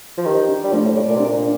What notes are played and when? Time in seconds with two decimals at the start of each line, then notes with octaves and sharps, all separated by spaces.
0.18 F3
0.26 D#3 G4
0.49 D4
0.63 G3
0.73 F3 A3
0.84 A2
0.96 A2 D5
1.09 A#2
1.16 C3
1.20 A#2 D4